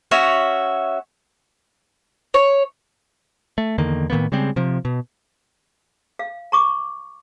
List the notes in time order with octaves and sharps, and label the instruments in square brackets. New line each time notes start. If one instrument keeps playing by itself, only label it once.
[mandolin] C#4 F#4 C#5 E5
C#5
[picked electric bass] A3
E2 D3 D#3 A#3
A2 D#3 A#3 B3
C#3 G3 G#3 C4
C3 F3
B2
[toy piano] F5
A#5 C#6 D6